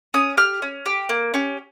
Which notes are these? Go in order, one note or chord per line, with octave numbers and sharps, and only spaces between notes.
C#4 D#6
G4 F6
C#4
G4
A#3
C#4 G4